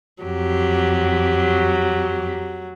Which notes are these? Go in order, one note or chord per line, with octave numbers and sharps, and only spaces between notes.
F2 F#3 G4